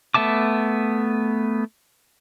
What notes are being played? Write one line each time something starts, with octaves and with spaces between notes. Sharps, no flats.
A3 B3 E5 A5 D6